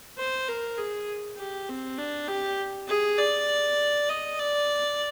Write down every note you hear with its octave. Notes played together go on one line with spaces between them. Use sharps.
C5
A#4
G#4
G4
C4
D4
G4
G#4
D5
D#5
D5